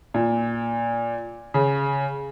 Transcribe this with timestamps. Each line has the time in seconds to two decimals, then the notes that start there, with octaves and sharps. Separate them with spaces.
0.14 A#2
1.54 C#3